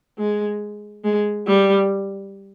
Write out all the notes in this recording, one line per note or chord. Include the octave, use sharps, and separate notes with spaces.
G#3
G#3
G3